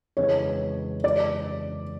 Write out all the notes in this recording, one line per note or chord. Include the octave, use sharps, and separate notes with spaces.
F2 C#3 E3 G#3 C#5
D5